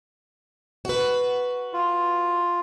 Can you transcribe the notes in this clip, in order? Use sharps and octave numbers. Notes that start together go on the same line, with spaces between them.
F#4 B4
F4